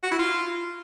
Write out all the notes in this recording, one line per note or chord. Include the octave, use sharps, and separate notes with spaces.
F#4
E4
F4